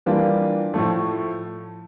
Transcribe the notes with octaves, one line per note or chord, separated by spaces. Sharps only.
E3 G3 A#3 D4 F4
A2 F3 A3